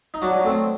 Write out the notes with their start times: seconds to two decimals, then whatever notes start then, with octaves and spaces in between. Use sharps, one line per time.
0.14 D#4
0.22 F#3 D4 F#4
0.45 A3 C4